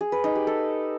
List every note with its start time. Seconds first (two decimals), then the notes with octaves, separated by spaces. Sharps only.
0.01 G#4
0.12 B4
0.24 D#4
0.35 G4
0.47 A4